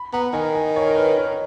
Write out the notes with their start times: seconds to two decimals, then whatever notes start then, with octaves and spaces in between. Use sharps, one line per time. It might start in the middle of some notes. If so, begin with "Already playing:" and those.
Already playing: B5
0.13 B3 A#5
0.33 D#3 G#5
0.55 G#5
0.76 C#5
0.89 A#4
0.96 B4
1.18 C#5